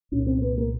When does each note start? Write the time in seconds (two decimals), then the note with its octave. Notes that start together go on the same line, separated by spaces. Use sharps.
0.12 C2 A#2 C#4
0.27 C4
0.42 B3
0.58 A#3